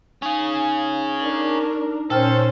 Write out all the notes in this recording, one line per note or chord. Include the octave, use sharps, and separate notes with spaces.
C#4 D#4 G#4 F5
D4 D#4 A#4
A#2 C#4 A4 C5 G5 F6